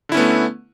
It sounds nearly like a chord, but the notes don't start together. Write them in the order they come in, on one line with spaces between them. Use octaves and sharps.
D3 E4 C#4 B3 A3